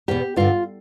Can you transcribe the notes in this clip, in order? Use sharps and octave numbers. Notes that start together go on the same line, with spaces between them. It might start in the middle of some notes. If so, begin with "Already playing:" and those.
E2 B2 G4
G2 D3 F4